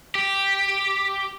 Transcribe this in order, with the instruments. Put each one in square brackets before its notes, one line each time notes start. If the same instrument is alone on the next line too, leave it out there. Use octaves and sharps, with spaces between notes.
[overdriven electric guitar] G4